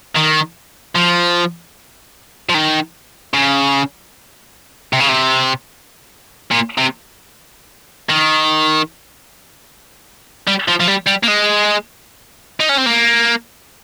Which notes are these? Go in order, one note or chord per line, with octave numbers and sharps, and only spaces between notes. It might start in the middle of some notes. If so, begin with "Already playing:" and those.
D#3
F3
F3
D#3
C#3
C3
C#3
C3
A#2
C3
D#3
G3
F3
F3
G3
G3
A#3
G#3
D#4
C#4
C4
A#3